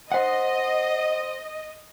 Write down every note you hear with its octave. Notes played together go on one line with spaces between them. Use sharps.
C5 D#5 F#5